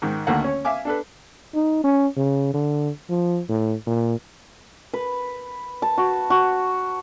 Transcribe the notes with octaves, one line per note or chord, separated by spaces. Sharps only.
G#2 D#3
D2 D3 D#3 A3 A#3 F#5
C#4 C#5
E5 F5 G#5 D6
D4 A4 B4
D#4
C#4
C#3
D3
F3
A2
A#2
B4
A5
F#4
F#4